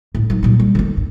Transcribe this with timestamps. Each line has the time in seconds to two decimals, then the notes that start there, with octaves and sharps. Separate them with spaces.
0.15 A2
0.30 F#3 D#4
0.43 A#2 F#3
0.60 G3
0.75 D#3 A3
0.97 G2